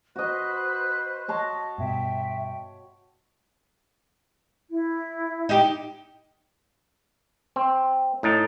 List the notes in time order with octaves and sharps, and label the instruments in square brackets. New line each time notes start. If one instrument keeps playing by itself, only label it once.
[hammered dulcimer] F#4 D#5 [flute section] B4 C5 [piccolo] F#6
[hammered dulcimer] C#5 A5 C6 [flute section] D#5
[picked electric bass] G2 B2 [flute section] E5 [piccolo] G5
[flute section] E4
[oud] D#4 G4
[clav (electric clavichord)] C4
A2 D#4 A5